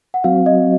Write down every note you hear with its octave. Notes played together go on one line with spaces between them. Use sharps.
F#5
F#3 C4 F#4 F5
D#5